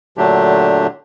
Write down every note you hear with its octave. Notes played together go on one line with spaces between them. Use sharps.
A#2 D3 F#3 A3 D4 G4